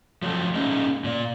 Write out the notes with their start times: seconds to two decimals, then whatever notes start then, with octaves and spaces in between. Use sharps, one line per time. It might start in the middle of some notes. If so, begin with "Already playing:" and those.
0.22 F3 F#3 A3 A4
0.55 G#3 A#3 C#4 D#4
1.04 A#2 D5